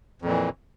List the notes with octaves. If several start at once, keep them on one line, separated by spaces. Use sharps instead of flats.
F2 A#2 E3